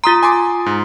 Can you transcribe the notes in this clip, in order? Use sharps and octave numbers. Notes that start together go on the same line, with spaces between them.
F4 A#5 C6 D#6 A6
G#5 C6 D6
G#2